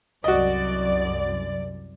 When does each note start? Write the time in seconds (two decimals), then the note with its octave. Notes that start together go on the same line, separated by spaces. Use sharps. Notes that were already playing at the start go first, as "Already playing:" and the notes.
0.24 C2 F#2 F#4 D5 D#5